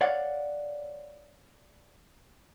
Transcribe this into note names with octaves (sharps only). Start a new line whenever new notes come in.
C#5 D5 F5 F#5